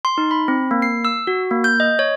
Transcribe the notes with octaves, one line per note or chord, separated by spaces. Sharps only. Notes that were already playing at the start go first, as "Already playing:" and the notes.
C6
D#4
B5
C4
A#3
C7
E6
F#4
A#3
G6
D#5
C#5